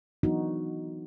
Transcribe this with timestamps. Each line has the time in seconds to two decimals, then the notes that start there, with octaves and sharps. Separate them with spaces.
0.23 E3 F#3 B3 D4 D#4 F#4